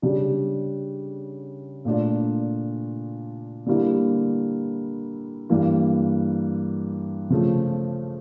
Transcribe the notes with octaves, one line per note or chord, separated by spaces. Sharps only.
C#3 G3 D4
A#2 A3 D4 F4
D3 G3 A#3 E4
G2 E3 A#3
C#3 F3 A3